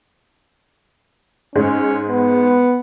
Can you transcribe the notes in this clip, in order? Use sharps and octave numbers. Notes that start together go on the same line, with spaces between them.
G#2 G#3 C#4
B3